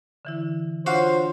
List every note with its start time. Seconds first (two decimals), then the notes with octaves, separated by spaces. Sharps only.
0.25 D3 E3 E4
0.86 D4 F4 F#4 C5 C#5 F5